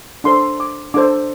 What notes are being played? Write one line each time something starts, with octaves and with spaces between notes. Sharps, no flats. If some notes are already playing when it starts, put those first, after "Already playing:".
D4 A4 C5 C6
D6
D4 A4 C5 D6